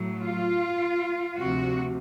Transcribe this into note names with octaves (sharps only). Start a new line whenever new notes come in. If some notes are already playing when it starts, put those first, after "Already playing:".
Already playing: A2 F#3
F4
D2 C3 F3 F#4